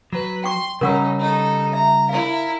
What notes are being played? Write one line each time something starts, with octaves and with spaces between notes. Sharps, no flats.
F#3 B4
G5 C6 C#6
C#3 G3 C#4 D#4 A#4 F#5 E6
D#4 A4
E5 A#5
E4 A#4 F5